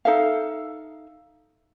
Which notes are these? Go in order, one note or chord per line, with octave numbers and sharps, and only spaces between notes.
D#4 A4 E5 F5